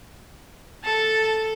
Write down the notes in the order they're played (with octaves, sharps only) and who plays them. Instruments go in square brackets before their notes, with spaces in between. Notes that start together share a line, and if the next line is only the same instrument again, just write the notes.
[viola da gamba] A4 [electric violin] A5